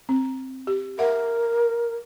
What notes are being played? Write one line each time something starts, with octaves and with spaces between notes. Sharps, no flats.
C4
G4
A#4 E5 F#5